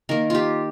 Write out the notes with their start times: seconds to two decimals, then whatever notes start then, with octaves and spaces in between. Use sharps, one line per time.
0.09 D#3 A#3 A#4
0.30 F4 G4